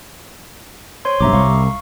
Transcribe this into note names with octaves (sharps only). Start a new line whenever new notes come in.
C5 C#5 C6
B1 G2 E5 A#5 D6
C2 F5 C#6